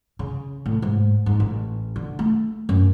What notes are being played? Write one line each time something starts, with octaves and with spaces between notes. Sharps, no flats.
C#3
A2
G#2
G#2
A1
D3
A3
F#2